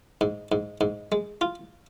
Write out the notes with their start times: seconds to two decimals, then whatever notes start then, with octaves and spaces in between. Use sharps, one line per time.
0.21 G#2
0.52 G#2
0.81 G#2
1.12 G#3
1.41 F4